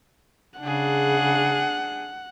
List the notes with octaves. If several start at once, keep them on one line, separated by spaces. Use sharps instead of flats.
C#3 D4 G#4 F#5